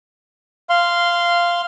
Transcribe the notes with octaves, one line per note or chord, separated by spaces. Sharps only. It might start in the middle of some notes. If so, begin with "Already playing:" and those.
F5 C6